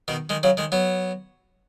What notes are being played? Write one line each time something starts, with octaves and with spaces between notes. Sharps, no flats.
B2 D#3
D#3 G#3
C#3 F#3
D#3 G#3
F#3 B3